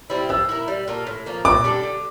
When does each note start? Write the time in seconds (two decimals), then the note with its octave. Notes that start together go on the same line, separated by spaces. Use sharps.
0.10 G3 C4 E4
0.29 F3 E6
0.49 A#3 E4
0.68 G3
0.88 A#3 F4 A4
1.07 A2
1.26 F3 A#3
1.45 A#2 D6
1.64 G3 D4 A4
1.83 D3